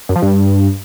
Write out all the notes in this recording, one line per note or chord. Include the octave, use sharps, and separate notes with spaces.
F#2
F3
G2